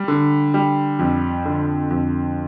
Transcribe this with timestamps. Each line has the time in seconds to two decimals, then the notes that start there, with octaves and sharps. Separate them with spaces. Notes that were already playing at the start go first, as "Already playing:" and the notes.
Already playing: G3
0.08 D3
0.54 G3
0.99 F2
1.45 D3
1.90 F2